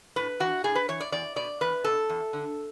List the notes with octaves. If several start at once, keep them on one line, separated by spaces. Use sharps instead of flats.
A2 B4
E3 F#4
A2 G#4
B4
E3 C#5
D5
E2 D5
B2 D5
E2 B4
B2 A4
E2
D3